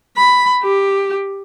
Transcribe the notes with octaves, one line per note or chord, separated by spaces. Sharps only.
B5
G4